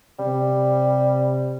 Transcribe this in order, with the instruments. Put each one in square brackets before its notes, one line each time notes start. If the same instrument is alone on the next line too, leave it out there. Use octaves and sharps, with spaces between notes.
[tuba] C3 [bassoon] G3